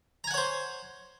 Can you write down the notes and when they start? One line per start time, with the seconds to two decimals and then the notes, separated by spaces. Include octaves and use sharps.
0.24 A#5
0.27 G#5
0.31 F#5
0.34 C#5
0.37 C5